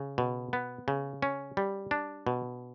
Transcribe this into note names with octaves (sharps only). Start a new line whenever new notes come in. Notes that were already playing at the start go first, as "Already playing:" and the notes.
Already playing: C#3
B2
B3
C#3
C#4
G3
D4
B2